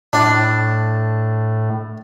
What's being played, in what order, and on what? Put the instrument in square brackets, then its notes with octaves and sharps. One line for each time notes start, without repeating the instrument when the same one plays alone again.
[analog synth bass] A2 [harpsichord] D4